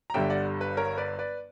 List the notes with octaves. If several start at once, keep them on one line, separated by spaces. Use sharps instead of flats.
A#5
G1 G2 D3 G3 E5 G5
D5 F#5
B4
A#4 C#5
B4 D5
B4 D5